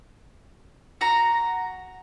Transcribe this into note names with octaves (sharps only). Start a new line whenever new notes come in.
F#4 A#5